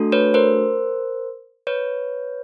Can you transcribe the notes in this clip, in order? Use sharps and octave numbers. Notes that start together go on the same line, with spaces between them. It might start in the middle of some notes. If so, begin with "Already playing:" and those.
Already playing: A3 D4 F#4 A4
B4 C#5
A#4 C5
B4 C#5